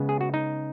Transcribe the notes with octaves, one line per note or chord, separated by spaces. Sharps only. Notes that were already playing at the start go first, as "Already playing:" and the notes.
Already playing: C#3 G#3 B3
G#4
F#4
D#4